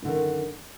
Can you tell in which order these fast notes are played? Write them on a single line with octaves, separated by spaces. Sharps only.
F#2 D3 D#3